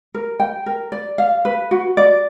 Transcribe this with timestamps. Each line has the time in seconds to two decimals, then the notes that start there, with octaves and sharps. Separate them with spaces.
0.14 A#4
0.40 G5
0.66 A#4
0.92 D5
1.18 F5
1.45 B4
1.71 F#4
1.97 D5